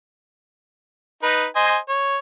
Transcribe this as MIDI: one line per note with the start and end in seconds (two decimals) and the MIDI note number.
1.23 1.45 63
1.23 1.45 71
1.56 1.77 72
1.56 1.77 75
1.56 1.77 80
1.89 2.18 73